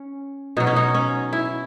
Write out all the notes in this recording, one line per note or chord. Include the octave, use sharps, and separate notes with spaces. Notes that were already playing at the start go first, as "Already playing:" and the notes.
Already playing: C#4
B2 F#3 D#4
C#4
D#4
C#4
E4